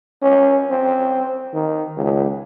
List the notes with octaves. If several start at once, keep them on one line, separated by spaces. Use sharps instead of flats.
C#4
C4
D#3
C#2